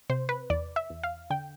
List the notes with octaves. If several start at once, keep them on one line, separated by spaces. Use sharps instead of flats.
C3 C5
B4
E2 D5
E5
E2
F5
D3 G5